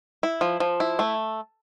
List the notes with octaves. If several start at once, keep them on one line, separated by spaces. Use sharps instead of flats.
E4
F3
F3
E4
A3